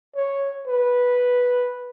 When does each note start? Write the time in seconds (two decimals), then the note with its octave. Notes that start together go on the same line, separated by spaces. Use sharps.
0.16 C#5
0.67 B4